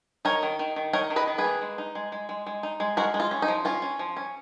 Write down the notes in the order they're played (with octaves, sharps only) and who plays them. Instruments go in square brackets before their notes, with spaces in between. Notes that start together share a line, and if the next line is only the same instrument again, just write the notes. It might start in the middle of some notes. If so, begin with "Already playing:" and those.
[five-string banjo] D#4 A#4 C#5
D#3
D#3
D#3
D#4 A#4 C#5
D#3
B4 D#5
D#3
G#4 B4
A#3
G#3
D#4
G#3
G#3
G#3
G#3
D#4
G#3
G#3 F#4 A#4
G#3
F4
C#4
D#4
F3
C#4 F4
C#4
F3
C#4